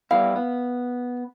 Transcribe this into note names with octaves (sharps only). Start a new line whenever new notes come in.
G3 B3 E4 F5
B3